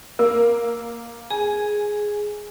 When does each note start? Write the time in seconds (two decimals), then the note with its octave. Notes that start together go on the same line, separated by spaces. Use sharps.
0.19 A#3 A#4
1.30 G#4 G#5